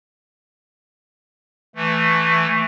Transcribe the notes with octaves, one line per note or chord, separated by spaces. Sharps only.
E3 A3